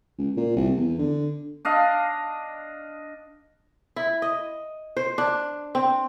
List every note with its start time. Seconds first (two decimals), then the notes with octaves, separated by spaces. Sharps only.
0.18 C#2
0.37 A#2
0.56 C2
0.77 E2
0.99 D3
1.65 D4 D#5 F5
3.96 E4
4.22 D#5
4.97 C5
5.18 D4
5.75 C4